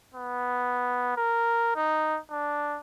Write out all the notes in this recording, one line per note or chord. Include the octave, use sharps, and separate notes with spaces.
B3
A#4
D#4
D4